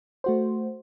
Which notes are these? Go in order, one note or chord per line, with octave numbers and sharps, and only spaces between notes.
A3 F#4 C5